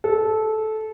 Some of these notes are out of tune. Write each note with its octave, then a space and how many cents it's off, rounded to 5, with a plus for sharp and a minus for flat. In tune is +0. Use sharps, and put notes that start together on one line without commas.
A4 -15